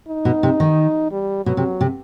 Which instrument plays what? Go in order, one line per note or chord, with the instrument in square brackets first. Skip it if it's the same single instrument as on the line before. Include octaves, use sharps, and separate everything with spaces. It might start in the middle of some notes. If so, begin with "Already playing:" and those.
[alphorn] D#4
[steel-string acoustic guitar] B2
C3
D#3
[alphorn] G3
[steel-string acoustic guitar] B2 [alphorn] F#3
[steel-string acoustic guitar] C3
C3